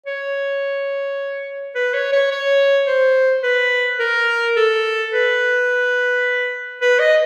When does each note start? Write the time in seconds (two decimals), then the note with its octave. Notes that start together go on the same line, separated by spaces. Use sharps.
0.06 C#5
1.75 B4
1.94 C#5
2.13 C#5
2.31 C#5
2.87 C5
3.43 B4
3.99 A#4
4.56 A4
5.12 B4
6.81 B4
6.99 D#5